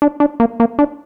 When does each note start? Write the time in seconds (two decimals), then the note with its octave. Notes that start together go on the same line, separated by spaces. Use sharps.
0.02 D4
0.20 D4
0.40 A#3
0.60 A#3
0.79 D4